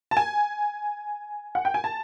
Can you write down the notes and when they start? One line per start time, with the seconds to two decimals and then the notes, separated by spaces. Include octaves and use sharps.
0.11 A5
0.17 G#5
1.55 F#5
1.65 G5
1.74 G#5
1.84 A5